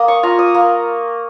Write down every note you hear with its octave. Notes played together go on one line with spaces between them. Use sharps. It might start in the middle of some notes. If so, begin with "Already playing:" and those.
Already playing: A#3 D#6
C#6
F4 A#5
D#6
A#3